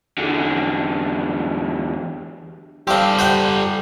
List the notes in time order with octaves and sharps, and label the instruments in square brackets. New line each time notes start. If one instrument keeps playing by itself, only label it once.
[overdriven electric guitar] E2 D3
[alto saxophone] G3 [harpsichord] C4 F5 [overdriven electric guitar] G4 A4
[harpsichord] C5 F#5 G5